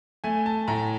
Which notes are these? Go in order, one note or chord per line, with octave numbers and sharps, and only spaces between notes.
A3 G#5
A5
A2 A#5